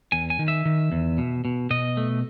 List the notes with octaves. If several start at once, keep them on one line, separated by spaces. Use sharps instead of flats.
E2 G#5
G#5
D#3
E5
D#3
E2
B2
B2
B2 D#5
A3